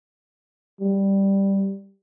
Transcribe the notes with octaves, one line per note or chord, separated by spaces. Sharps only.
G3